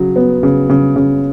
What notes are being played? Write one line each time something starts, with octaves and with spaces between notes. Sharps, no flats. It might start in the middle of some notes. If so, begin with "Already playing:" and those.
Already playing: C#3 F#3
B3
C#3
C#3
C#3